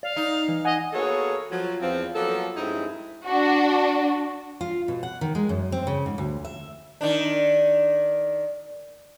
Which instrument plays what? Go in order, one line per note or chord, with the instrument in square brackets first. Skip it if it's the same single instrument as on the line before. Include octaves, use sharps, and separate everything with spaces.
[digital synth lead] D5 [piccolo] F5
[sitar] D#4
[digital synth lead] E3
[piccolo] D#5 [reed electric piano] F#5 G#5
[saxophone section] A#3 B3 F#4 G#4 A4 C#5
F3 F#3
E2 F3 C4
F3 F#3 A#3 B3 A4
G2 G#3 C4 D#4 E4
[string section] D4 F#4
[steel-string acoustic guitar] F4
B2
F#5
D#3
G#3
F#2
C4
C#3
G#2
D2
E5
[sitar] D#3 D4